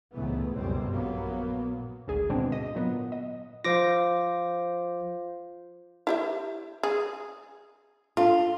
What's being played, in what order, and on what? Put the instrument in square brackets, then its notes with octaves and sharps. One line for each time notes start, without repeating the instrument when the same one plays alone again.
[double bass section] C#2 G#2 E3 A3 B3
G1 C#2 F#2 B2 G3 C4
A#1 F#3 A#3 B3
[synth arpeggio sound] G#1 D2 G#4
G#2 B2 D3 G#3 C4 D4
D#5
A#2 F#3 B3
D#5
[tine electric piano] F3 D6 A#6 [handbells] F4 C5 F5
[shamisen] E4 G4 E5
G#4
[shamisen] D3 [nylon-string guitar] F4